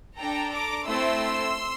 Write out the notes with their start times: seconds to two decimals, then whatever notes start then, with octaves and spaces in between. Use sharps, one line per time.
0.19 D4 A4 G5 A#5
0.53 A#5 D6
0.85 A3 C4 E4 C6 E6